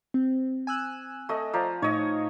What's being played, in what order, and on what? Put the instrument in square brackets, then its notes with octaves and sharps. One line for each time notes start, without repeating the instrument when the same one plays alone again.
[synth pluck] C4
G#5 E6 F#6
[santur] A3 D#5
F3 D5 A#5
[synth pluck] A2 D#4 [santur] C#5 D#5